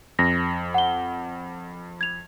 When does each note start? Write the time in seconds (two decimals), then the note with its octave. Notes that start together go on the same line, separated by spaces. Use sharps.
0.19 F2 A#6
0.74 F#5 G7
2.01 G#6 F7